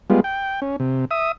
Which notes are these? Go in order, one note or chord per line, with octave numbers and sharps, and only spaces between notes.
G3 G#3 B3 F4
G5
C#4
C3
E5 D#6